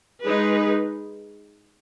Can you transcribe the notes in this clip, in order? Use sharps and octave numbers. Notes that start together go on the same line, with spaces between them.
G#3 D#4 G#4 B4